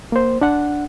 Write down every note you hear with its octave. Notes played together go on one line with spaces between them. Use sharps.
A#3 C5
D4 F#5